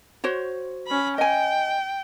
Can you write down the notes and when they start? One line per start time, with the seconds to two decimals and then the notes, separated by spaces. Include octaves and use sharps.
0.24 F#4 C5 C#5
0.87 C#4 B5
1.18 D#5 G5 G#5